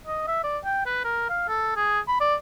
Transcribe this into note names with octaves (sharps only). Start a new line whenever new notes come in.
D#5
E5
D5
G5
B4
A#4
F5
A4
G#4
B5
D5